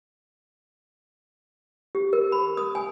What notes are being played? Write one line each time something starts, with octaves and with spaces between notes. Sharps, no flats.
G4
A#4
B5
D#6
G#5